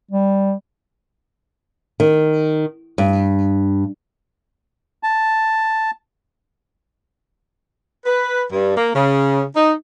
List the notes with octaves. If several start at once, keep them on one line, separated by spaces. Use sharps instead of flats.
G3
D#3
G2
A5
B4
G2
A#3
C#3
D#4